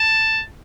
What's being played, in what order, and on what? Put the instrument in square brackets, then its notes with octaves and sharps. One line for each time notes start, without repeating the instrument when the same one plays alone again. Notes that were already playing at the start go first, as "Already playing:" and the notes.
Already playing: [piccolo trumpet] A5